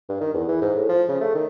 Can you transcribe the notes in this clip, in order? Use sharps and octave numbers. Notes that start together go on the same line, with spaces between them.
G2
D#3
E2
E3
G#2
A2
F3
C#3
A3
D#3